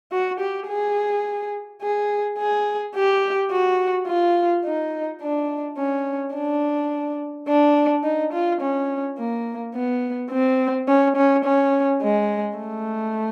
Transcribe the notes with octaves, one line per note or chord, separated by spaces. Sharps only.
F#4
G4
G#4
G#4
G#4
G4
F#4
F4
D#4
D4
C#4
D4
D4
D#4
F4
C#4
A#3
B3
C4
C#4
C#4
C#4
G#3
A3